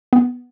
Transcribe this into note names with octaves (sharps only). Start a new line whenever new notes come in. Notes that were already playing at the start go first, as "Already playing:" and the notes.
B3